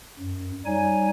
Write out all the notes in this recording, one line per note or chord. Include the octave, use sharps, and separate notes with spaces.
F#2
G3 D#4 C#5 G#5